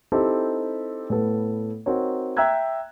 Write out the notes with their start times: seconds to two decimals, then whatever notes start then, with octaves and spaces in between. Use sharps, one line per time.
0.12 C4 D#4 E4 G4 A4
1.10 A2 B3 A4
1.86 C4 D#4 F#4 A#4 C#5
2.37 E5 G5 A#5 E6 F#6 G#6